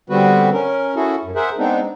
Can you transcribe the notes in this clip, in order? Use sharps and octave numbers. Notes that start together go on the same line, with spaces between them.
D3 G3 B3 C4 F#4 B4
C#4 A#4
C#4 E4 F#4 G#4 A4
F#2
G#4 A#4 C5 E5 F#5
G#3 B3 C4 D4 D#4